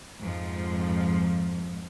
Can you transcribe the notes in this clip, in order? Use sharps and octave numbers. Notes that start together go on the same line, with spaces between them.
F2 G#2 F3